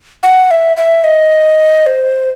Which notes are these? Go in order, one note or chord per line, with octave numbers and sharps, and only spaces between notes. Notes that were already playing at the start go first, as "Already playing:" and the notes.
F#5
E5
E5
D#5
C5